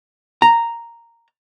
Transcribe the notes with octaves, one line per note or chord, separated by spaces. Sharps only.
A#5